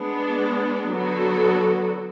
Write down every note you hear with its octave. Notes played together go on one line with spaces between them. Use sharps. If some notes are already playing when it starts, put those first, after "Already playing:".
Already playing: G#3 B3 D4
D3 F#3 B3 F#4 A4